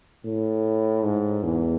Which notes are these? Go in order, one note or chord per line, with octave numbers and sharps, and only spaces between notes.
A2
G#2
E2